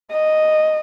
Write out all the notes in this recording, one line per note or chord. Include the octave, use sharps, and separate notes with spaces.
D#5